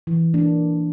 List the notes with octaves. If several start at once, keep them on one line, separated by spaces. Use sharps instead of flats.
E3
A#3 D4